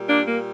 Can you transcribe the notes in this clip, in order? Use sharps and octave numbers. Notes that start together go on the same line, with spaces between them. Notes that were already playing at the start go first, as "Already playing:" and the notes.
Already playing: A#2 G3
A#3 D4
A#3